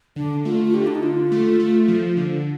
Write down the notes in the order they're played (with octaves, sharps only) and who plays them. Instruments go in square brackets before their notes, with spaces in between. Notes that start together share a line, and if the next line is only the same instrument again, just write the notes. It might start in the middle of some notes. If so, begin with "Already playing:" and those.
[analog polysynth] D3 [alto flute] D4
[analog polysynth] A3 [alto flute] F4
[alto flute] F4
[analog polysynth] D3 [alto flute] G4
[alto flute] D4
D#4
[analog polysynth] D3 [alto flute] F4
[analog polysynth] A3
A3
F3
D3